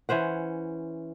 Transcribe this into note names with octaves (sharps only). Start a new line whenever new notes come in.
E3 C#4 C5 F#5